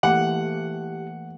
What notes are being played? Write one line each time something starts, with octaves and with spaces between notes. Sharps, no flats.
E3 A3 A#3 G4 F#5